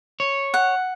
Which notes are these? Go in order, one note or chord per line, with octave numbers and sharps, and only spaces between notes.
C#5
F#5